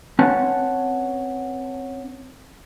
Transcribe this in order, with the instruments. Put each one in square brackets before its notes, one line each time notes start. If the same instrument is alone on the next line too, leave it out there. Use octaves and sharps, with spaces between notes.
[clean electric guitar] C4 C#4 B4 C#5 F#5 A5